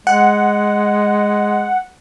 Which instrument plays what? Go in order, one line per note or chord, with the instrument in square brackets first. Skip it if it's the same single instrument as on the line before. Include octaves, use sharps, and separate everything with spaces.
[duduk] G#3 [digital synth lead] F#5